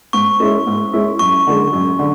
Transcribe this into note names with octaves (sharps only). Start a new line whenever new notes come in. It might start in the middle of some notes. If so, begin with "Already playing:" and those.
G#2 C#6
G#3 C#4 E4
G#2
G#3 C#4 E4
F#2 C#6
D3 G#3
F#2
D3